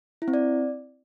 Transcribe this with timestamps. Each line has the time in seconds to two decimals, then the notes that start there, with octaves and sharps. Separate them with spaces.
0.22 E4
0.28 C4
0.33 D5